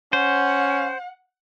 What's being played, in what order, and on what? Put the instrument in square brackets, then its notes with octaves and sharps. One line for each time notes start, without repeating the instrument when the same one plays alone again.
[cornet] C#4 [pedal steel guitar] C5 [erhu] F#5